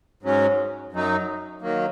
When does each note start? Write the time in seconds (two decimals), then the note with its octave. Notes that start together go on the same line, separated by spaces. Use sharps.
0.23 G#2 F#3 C#4
0.92 F#2 F#3 D#4
1.62 D#3 F#3 A#3